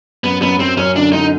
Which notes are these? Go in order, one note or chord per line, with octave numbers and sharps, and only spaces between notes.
F#2 B3
F#2 B3
F#2 C4
F#2 C#4
D3 D4
D3 D#4